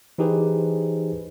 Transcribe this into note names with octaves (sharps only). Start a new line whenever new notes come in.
E3 D#4 G4 G#4 B4 C5